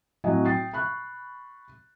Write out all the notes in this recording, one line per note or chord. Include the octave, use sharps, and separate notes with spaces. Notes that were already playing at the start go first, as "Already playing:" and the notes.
A2 F#3 C4 F#4 D#5 G#5
G5 D#6 A6 C7
B5 C#6 F#6